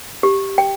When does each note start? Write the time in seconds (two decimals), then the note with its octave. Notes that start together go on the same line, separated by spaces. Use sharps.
0.23 G4
0.58 G5